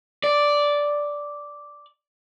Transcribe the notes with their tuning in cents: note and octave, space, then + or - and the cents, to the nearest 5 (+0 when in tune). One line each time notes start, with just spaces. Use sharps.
D5 -5